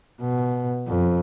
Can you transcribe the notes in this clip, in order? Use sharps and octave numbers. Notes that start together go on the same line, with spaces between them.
B2
F2